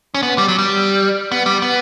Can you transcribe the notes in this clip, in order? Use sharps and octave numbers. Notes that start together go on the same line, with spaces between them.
C#4
B3
G3
F#3
G3
B3
G3
B3